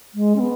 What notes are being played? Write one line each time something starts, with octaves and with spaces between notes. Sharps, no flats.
G#3
C#4
B3